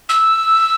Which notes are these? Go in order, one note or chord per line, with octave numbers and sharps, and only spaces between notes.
E6